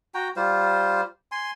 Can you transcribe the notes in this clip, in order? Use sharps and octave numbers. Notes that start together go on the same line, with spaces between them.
F#4 G5 A#5
G3 F4 C5
G#5 C6